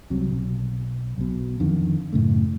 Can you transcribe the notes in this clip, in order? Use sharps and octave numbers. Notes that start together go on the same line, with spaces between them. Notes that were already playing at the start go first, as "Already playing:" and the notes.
C2 C3 F#3
B1
B1 B2
F2 D3 D#3
F#2 A2 C#3 A3